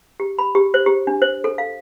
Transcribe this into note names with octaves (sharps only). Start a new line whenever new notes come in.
G4
B5
G4
C5
G4
D4
C5
A4
F5